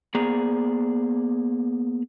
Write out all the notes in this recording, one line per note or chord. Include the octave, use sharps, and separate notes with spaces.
A#3 B3 G#4 C5 D5 A#5